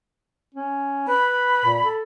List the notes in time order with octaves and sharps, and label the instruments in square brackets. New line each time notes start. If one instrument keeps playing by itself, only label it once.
[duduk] C#4
[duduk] B4 [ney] B5
[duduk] A#2
A4